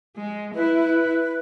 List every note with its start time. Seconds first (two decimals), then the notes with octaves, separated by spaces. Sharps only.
0.16 G#3
0.55 E4 B4